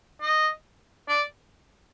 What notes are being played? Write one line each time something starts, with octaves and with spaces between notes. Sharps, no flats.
D#5
D5